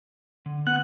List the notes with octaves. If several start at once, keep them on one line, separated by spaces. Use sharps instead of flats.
D3
B3 F#5 F#6